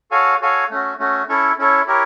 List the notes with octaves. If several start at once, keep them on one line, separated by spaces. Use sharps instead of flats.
F#4 A4 C#5 F5 G#5
F#4 A4 C#5 F5 G#5
A3 C#4 F#4
A3 C#4 F#4
C#4 E4 A4 C#5
C#4 E4 A4 C#5
E4 G4 A#4 C#5